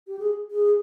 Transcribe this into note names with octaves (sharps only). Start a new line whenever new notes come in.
G4
G#4
G#4